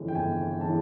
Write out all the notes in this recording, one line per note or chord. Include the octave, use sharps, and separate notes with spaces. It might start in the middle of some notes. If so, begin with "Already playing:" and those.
Already playing: G1 F2 C#3 E3
G5
G1 G#5
C#3 E3 A5